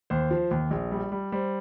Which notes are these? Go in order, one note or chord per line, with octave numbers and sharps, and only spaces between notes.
D#2 C5
F3
D#2
A#1
G3
G3
G3 C5